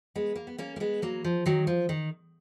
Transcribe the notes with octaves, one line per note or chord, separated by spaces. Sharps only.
G#3 B3
A#3
B3
A#3 C#4
A#3
G#3 B3
F#3 A#3
F3
D#3 F#3
F3
D#3